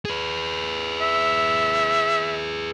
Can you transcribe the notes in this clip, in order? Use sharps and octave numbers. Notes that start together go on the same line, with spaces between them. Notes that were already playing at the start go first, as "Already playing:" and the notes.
G#4 B4
E5